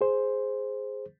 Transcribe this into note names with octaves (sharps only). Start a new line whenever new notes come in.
G#4 C5